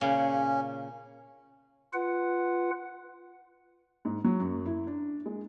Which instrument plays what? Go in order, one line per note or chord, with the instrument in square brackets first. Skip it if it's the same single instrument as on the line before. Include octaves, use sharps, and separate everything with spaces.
[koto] A#2 C#3 [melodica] C#4
[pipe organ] F4 B4 F#5
[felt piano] G#2
F#3
F#2
E4
D4
G#3